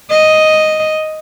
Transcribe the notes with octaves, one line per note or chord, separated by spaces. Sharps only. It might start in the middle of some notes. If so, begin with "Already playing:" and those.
D#5